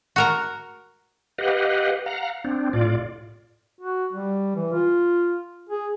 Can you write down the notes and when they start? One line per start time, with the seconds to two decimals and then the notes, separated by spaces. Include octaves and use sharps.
0.16 F#4 A#4 A#5
1.38 G4 B4 D#5 F5 F#5
2.06 F5 F#5 A#5
2.44 C4 D4
2.73 A2 F4 D5
3.81 F#4
4.13 G3
4.56 E3
4.73 F4
5.69 G#4